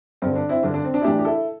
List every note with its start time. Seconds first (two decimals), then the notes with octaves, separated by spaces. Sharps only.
0.22 G2 D3 C4
0.36 D4
0.49 C4 E4
0.63 G2 D3 D4
0.74 D4
0.85 C4
0.94 D4
1.01 E4
1.04 A2 E3 D4 G4
1.19 G4
1.25 E4 A4